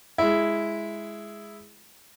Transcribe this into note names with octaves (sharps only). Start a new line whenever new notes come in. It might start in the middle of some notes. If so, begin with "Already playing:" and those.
G#3 E4